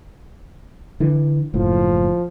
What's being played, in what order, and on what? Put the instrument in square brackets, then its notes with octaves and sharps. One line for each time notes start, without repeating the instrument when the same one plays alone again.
[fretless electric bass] D3 E3
[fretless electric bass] F#1 A2 [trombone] F3